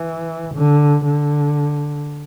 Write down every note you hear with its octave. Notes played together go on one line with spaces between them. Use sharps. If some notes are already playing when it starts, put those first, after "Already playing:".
Already playing: E3
D3
D3